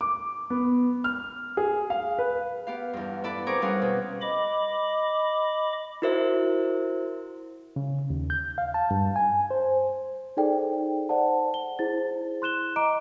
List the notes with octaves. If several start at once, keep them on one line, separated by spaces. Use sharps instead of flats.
D6
B3
F6
G#4
F5
B4
B3 G4 F5
E2 G2
B3 E4 A4 D5 B5
C4 G#4 A#4 C#6 D6
G3 C4 C#4 G#4 F5 F#5
B2
D#5 B5 D6
E4 F#4 A#4 C5 E5
C#3
D#2
G6
F5
A5
G2
G#5
C5
D#4 G#4 A4 C5 D5 G5
C5 D5 F#5 A5
G7
E4 G#4 C5 A6
C6 F#6 E7 G7
D#5 A#5 D6 D7